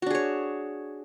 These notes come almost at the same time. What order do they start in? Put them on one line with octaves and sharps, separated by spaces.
F#4 D4 G#4 C#5